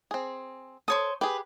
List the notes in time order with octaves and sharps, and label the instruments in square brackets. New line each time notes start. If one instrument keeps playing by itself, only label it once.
[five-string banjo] C4 G#4
[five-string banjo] A4 [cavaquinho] C5 C#5 D#6
[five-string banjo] G4 G#4 [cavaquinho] B4